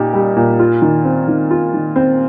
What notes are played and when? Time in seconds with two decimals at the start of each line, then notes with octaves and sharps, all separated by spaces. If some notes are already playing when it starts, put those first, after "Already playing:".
Already playing: A#2 G3 D#4 G4
0.14 G3
0.36 A#2
0.59 F4
0.82 D#3
1.05 C4
1.28 D#3
1.51 F4
1.74 D#3
1.96 C4